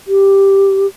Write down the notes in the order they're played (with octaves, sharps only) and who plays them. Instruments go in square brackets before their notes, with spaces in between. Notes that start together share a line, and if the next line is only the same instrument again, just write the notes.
[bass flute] G4